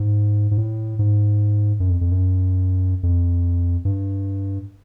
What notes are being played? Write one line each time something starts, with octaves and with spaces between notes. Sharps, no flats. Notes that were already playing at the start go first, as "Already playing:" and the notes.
Already playing: G#2
G#2
A2
G#2
F#2
F2
F2
F#2
F2
G2